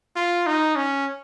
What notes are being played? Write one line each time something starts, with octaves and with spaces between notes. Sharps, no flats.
F4
D#4
C#4